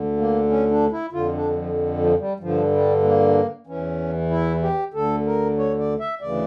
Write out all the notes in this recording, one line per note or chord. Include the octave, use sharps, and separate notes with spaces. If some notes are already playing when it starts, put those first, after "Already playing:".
Already playing: D2 D3
A#3
C#4
D4
E4
F2 D3 F4
D4
G3
F3
F3
G3
G2 D3 F3
G3
A#3
E2 E3 C#4
E4
G4
D2 D3 A4
A#4
C#5
D5
E5
D2 C#3 E3 D5